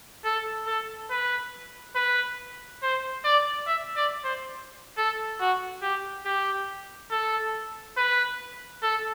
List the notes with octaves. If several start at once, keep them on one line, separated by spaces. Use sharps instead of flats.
A4
A4
B4
B4
C5
D5
E5
D5
C5
A4
F#4
G4
G4
A4
B4
A4